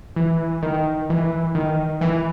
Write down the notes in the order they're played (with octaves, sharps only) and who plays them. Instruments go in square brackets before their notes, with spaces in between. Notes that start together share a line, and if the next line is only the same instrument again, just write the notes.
[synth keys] E3
D#3
E3
D#3
E3